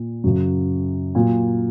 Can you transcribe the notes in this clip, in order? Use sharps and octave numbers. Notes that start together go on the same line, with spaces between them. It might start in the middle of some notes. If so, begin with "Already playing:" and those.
Already playing: A#2
F#2 C#3 F#3
A#2 F#3